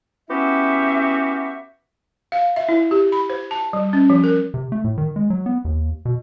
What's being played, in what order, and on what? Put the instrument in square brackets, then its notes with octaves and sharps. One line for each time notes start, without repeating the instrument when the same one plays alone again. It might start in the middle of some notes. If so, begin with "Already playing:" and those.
[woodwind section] B3 C#4 E4 F#4 G4 E5
[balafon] F5
E5
E4
G4
B5
C5
A5
G3
C#4
F3
A#4
[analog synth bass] C3
A3
A2
D#3
G#3
F#3
B3
D#2
B2